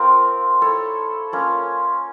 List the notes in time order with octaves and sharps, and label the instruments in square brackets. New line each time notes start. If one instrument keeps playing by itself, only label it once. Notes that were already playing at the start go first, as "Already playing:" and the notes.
Already playing: [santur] C4 F4 A#4
E4 A4 C#5
A#3 C#4 F4